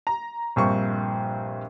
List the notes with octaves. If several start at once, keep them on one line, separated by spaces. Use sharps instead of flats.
A#5
A#1 G2 C4 C#6